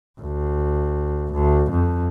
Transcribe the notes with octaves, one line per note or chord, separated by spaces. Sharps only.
D2
D2
F2